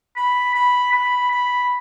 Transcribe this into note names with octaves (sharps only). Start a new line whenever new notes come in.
B5
B5
B5
B5